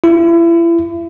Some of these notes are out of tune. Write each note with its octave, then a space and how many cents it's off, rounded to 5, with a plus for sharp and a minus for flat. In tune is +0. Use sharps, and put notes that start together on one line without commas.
E4 +35